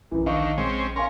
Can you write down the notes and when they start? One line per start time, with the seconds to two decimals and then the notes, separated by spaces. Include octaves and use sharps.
0.11 A#1 F#2 E3
0.26 D2 D#3 D#5 F5 C#6
0.58 C#3 G#3 C4 C#4
0.96 C#4 A#4 F5 G#5 C6